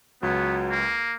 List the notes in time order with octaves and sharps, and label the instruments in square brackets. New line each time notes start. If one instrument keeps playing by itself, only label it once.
[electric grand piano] C#2 [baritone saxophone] F#3 [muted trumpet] B3
[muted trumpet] A#3